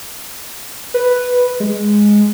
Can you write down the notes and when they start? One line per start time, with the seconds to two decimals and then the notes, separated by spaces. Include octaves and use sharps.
0.94 B4
1.60 G#3